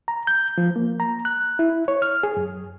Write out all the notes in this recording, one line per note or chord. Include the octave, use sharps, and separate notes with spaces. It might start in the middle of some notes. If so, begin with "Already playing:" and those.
A#5
G6
F3
A#3
A#5
F#6
E4
C#5
F6
G#4
F#2